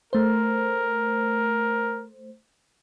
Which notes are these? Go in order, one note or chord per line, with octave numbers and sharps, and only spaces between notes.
A3 A#4 C5